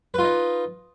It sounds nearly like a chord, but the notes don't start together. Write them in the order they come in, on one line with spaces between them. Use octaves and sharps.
B4 F4 D#4